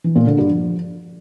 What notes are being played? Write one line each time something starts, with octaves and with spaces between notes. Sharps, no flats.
E3
A#2
D3
G2
F3